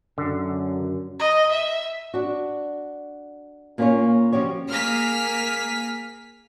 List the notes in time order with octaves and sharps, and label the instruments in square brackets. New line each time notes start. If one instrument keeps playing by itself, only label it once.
[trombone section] F#2 [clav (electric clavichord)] D3
[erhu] D#5
E5
[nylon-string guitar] D4 F#4
A#2 A#3 C#4 D#4 F4 C#5
F3 C#4 F#4 G4 C#5
[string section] A#3 G#4 F6 B6